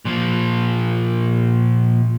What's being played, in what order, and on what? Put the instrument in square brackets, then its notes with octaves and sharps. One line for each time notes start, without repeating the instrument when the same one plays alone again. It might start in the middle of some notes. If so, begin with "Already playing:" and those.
[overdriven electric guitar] A#2 F3